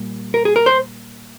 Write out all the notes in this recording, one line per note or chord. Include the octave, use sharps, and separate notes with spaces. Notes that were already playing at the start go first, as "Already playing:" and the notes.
Already playing: A#2 G3
A#4
G#4
A#4
C5